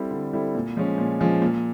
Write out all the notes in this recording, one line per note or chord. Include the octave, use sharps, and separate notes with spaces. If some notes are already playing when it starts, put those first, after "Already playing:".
Already playing: G3 C4 E4 A4
D3
G3 C4 E4 A4
A#2
F3 G#3 C#4
A#2
F3 G#3 C#4
A#2